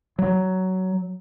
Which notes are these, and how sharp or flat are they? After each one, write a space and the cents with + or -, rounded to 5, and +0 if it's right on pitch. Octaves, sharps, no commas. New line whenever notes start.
F#3 +15